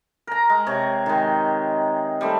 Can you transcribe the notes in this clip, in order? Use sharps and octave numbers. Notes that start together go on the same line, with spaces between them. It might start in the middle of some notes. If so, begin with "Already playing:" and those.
A#4 A#5
G#3
C3 C#5
D#3 G#3
G3 A3 C4